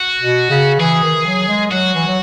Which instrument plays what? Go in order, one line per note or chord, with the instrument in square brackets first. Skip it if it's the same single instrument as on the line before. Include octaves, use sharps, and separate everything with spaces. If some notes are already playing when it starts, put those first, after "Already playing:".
Already playing: [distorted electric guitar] F#4
[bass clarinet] B2
C#3
[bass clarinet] E3 [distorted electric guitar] G#4
[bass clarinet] D#3
F#3
G#3
[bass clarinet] F#3 [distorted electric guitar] F#4
[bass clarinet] E3
F#3